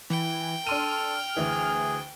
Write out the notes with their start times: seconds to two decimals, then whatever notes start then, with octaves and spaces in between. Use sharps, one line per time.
0.10 E3 G5
0.67 D4 A4 C6 F6 D#7
1.37 D2 E3 G#4